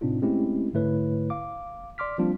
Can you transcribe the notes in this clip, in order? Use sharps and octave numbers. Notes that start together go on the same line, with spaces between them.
A2 C3 C4 D4 D#4 F4
G#3 A3 C4 C#4 E4 G4
G#2 D3 A3 E4 B4 C#5
F5 D6
D5 C6 D6 F6 B6
F3 G3 A#3 C4 D4 F4